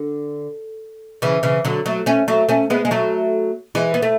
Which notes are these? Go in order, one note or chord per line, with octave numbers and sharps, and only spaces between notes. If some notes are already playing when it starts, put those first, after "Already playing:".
Already playing: D3
C#3 E3
C#3 E3
D3 F#3
F#3 A3
A3 C#4
F#3 A3
A3 C#4
G#3 B3
G#3
F#3 A3
E3 G#3
B3
A3